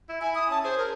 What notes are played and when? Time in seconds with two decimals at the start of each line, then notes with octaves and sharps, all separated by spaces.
0.09 E4
0.21 E4 G#5
0.35 D#6
0.51 C#4 A5
0.64 G#4 C5
0.77 A#4